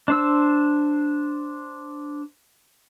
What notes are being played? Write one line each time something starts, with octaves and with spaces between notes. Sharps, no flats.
D4 C5 E6